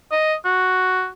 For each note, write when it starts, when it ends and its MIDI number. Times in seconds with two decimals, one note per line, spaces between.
0.11 0.34 75
0.45 1.08 66